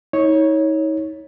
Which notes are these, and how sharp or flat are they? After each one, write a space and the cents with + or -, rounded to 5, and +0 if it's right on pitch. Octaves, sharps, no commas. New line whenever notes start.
D#4 +40 C#5 -5